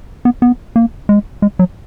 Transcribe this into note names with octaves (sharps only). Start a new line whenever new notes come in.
B3
B3
A#3
G#3
G#3
F#3